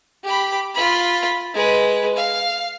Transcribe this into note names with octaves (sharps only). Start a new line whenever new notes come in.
G4 B5
F4 B5
G#3 B4
F5